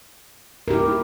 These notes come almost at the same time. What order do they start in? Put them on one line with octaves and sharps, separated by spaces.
A#4 G4 E4